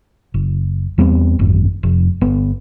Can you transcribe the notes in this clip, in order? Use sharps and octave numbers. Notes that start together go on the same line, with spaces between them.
F#1
E2 G3 B3 C4
D1 G#1 F#2
F1
G1 B3